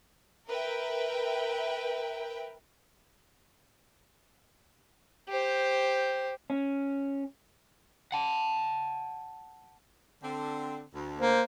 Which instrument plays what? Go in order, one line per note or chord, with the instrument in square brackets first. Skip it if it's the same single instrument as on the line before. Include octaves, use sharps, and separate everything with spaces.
[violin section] A#4 B4 E5 G5
[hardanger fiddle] G4 C5
[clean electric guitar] C#4
[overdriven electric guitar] F#5 A5
[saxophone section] D3 C4
D2
[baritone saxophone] A#3 [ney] C5